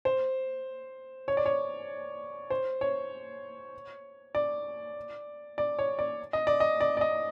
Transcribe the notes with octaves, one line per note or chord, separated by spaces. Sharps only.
C5
C#5
D5
C#5
C5
C#5
D5
D5
C#5
D5
D#5
D5
D#5
D5
D5
D#5